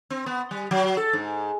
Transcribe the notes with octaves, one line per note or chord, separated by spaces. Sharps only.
C4
B3
G3
F#3
A4
G#2